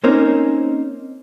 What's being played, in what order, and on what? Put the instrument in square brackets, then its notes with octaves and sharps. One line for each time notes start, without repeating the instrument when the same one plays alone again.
[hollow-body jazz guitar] A#3 C4 C#4 D#4 A#4 C5